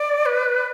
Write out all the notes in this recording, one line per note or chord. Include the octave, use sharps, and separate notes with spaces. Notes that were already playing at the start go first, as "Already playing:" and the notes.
Already playing: D5
B4